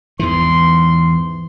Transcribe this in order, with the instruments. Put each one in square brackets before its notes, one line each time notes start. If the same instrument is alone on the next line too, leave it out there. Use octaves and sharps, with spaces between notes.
[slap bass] E2 G#2 E3 [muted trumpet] C6